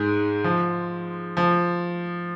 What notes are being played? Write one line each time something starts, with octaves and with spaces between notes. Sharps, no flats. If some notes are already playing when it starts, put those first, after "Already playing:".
Already playing: G#2 G#3
F3
F3